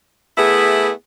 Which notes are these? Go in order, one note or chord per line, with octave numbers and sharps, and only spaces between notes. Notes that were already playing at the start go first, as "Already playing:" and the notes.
A3 B3 E4 G#4